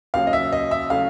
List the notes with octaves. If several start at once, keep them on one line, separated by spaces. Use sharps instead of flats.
D#2 C#3 F#3 F5
D#5
E5
D#5
E5
C#3 F#3 A3 F5